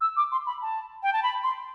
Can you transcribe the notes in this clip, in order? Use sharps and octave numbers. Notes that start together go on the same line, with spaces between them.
E6
D6
C6
B5
A5
G5
A5
B5
C6